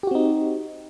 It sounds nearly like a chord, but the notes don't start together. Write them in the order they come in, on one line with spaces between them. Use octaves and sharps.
G4 F#4 C4 D#4